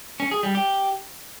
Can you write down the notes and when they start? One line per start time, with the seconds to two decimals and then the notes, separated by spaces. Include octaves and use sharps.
0.20 C#4
0.31 G#4
0.43 G3
0.55 G4